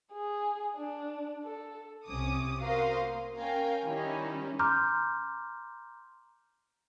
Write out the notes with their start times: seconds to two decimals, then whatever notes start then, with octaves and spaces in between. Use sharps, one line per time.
0.13 G#4
0.76 D4
1.44 A4
2.06 C2 C3 C#4 D6 D#6
2.59 F#4 A#4 C5 F5 C6 D#6
3.02 A#3
3.35 C#4 A#4 F5 G5 G#5
3.84 D#3 G3 C#4 D#4 E4
4.59 A#5 C6 D6 F6 G6